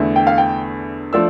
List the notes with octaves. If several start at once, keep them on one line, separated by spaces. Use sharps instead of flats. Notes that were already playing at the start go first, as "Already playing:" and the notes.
Already playing: E2 D3 A3 E4
G5
F5
G5
F3 A3 D4 E6